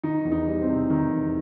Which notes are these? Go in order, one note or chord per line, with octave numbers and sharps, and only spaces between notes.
D#3 D#4
E2
D#4
G3
C4
C3
D#3
E2